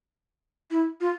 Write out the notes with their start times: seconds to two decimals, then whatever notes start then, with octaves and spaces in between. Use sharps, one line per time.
0.71 E4
1.01 F4